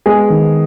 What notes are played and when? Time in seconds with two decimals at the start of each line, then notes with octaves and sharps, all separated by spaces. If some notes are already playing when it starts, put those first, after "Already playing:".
0.06 G#3 B3 G#4
0.30 D#3